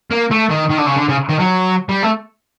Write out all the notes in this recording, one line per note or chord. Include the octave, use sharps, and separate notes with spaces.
A#3
A3
D#3
D#3
D3
C#3
D3
C#3
D#3
F#3
G3
A3